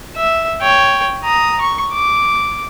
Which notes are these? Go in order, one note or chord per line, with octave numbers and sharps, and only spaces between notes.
E5
C#5 G5
A#5 D#6
C#6
D6